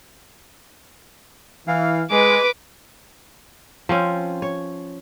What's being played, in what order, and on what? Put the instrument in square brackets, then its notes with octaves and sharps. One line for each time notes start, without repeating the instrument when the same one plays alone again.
[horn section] E3 F5
[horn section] G#3 [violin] B4 D6
[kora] F3 C4 C#4
C#5